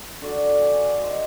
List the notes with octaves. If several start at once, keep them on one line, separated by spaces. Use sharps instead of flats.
D3 F#4 D5
G#5
D5
C5 D#5 E5